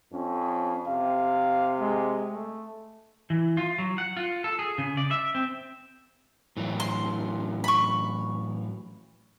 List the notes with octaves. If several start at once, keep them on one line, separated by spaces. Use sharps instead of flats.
F2 C#4
C3 F5
G#3
A3
E3
F4
F#3
F#5
F4
A4
G#4
C#3
D5
E5
C4
A2 E3 F#3
C6
B5 C#6